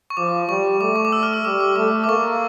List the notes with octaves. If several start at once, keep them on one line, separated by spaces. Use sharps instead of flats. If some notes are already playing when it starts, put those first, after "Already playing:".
C#6
F3 D6
G3 C#6
A3 D6
C#6
D6
E6
F6
E6
G3 D6
D6
A3 D6
D6
A#3 C#6